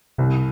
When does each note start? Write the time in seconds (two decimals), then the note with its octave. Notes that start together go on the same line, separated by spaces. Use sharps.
0.18 C2 C3